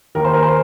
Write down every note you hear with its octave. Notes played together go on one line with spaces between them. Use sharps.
D#2 D#3 A#4
C5
A#4
C5